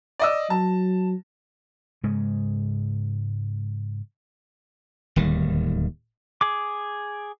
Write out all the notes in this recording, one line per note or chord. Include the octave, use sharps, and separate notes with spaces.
D5 D#5 E6
F#3 A5
G#2 C#3 G#3
D1 D#2 D#3 G3
G#4 D6